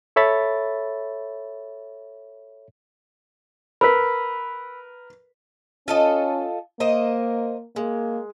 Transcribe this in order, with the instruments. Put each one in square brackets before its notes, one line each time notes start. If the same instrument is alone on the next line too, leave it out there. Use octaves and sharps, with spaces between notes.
[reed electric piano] A4 C#5 E5 B5 A6
[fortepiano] A#4 B4 [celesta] B5 E6 B6
[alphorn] C#4 [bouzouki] F4 A4 D#5
[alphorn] A#3 [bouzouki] A#4 C5 D#5
[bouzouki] G#3 [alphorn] A#3